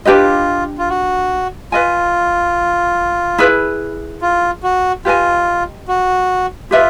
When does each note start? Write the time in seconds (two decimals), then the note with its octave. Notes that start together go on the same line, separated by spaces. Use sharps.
0.05 D4 F4 G4 B4 D#5
0.78 F4
0.89 F#4
1.72 F4 B4 D#5 G#5
3.38 E4 G#4 B4
4.22 F4
4.63 F#4
5.05 F4 G4 B4 D#5 G#5
5.88 F#4
6.71 F4 G4 B4 E5